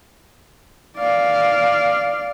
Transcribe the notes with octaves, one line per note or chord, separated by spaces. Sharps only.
D5 F5